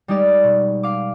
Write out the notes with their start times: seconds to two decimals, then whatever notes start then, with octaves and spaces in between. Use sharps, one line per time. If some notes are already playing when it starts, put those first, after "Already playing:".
0.08 G3 G#3 D#4 G4 D5
0.44 B2
0.83 F5 D6